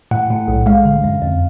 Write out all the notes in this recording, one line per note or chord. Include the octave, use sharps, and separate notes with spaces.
A2 F#5
A2
B1
G#3 F5
D3
F#2
F2